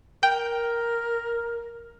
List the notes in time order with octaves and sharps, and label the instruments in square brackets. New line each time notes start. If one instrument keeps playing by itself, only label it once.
[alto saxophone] A#4 [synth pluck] G5